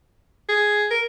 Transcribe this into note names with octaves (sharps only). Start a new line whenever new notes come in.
G#4
A#4